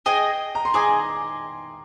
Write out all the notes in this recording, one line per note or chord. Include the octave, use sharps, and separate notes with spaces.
G#4 D#5 G5 G#5
A#5
C6
G#4 D#5 G#5 D6